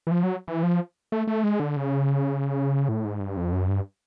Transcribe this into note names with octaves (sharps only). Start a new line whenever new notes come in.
E3
F3
F#3
E3
F3
A3
A3
G#3
D3
C#3
A2
G#2
G2
F2
F#2
G2